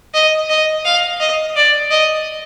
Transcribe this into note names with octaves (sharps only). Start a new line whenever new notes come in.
D#5
D#5
F5
D#5
D5
D#5